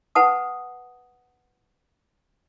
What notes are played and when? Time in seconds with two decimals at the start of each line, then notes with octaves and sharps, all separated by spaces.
0.15 B4 F#5 A5 D#6